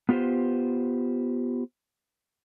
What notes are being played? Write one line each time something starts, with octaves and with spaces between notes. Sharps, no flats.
B3 F4 G4 B4 C5